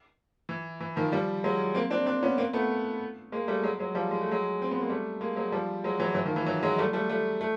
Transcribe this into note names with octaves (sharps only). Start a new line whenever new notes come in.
E3
E3
D#3 F3
F3 G3
F#3 G#3
A#3 C4
C4 D4
C4 D4
B3 C#4
A#3 C4
A3 B3
G#3 A#3
G3 A3
F#3 G#3
F#3 G#3
F3 G3
G#3
A3
F#3 G#3
C4
B3
A#3
G3 A3
G#3 A#3
F#3 G#3
F3 G3
F#3 G#3
E3 F#3
E3 F#3
D#3 F3
E3
E3 F#3
F#3 G#3
G3 A3
G3 A3
G3 A3
A3